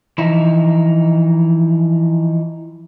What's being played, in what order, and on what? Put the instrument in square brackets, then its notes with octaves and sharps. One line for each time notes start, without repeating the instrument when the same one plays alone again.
[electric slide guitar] E3 F3 D#4